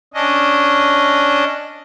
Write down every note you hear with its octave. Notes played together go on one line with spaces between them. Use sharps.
C#4 D4 D#5